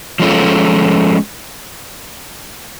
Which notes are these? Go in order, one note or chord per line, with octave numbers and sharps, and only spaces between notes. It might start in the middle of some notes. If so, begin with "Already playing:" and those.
F3 G#3 C#4 F4 A4